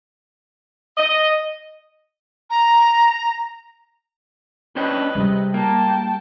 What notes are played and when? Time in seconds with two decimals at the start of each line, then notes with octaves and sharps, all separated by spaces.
0.98 D#5
2.50 A#5
4.76 C#4 D4 B4 D#5 G5
5.15 C3 G3 G#3
5.54 A#3 G5 A5